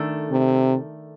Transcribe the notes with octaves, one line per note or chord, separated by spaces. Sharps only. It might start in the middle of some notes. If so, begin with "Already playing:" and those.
Already playing: D#3 A3 D4 A4
C3